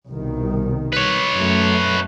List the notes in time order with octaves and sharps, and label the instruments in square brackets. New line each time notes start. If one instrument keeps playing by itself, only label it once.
[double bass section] C2 B2 D#3
[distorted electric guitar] B4 C#5
[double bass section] F#2 A3